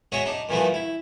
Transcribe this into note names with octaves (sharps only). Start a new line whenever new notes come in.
G#3 F#4 C#5 D#5 E5
D4 D#4
G2 A#2 E3 F3 A3 F#4
E4